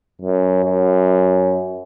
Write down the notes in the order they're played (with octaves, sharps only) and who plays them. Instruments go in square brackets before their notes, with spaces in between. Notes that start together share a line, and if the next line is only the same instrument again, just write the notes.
[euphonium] F#2
F#2